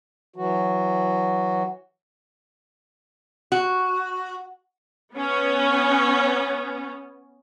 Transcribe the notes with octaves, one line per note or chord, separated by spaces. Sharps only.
E3 F#3 F#4
F#4
B3 C#4